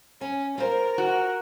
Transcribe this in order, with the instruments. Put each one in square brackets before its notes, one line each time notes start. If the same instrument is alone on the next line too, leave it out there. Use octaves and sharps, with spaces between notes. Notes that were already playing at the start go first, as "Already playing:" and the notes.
[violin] C#4 [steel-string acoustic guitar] G#5
[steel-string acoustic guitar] F4 C5 [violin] A#4
[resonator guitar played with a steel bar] F#4